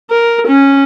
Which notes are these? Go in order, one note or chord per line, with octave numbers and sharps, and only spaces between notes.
A#4
C#4